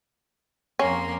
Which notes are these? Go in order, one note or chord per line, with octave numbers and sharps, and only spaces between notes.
F2 A#3 C#4 C6